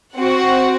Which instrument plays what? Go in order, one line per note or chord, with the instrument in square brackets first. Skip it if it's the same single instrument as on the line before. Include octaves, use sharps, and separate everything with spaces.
[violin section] C4 F#4 F#5